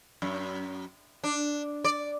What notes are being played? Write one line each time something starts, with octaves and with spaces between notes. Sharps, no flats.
F#2
D4
D5